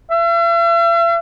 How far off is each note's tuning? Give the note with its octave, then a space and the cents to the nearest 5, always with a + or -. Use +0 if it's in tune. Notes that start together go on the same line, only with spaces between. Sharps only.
E5 +45